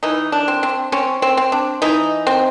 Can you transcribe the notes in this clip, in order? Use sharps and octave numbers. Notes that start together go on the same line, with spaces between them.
E3 D#4
D4
C4
C4
C4 C#4
C4
C4
D4
E3 D#4
C4